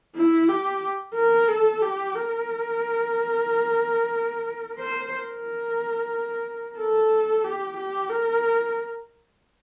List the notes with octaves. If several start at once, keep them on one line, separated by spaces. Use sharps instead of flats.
E4
G4
A#4
A4
G4
A#4
C5
A#4
A4
G4
G4
A#4